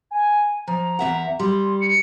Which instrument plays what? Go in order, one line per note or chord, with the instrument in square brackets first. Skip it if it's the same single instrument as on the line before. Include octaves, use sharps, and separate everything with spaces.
[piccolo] G#5
[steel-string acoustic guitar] F3 [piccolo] A#5
[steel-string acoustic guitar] E2 E5 F#5
[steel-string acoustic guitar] G3 [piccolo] C6
[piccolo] C#7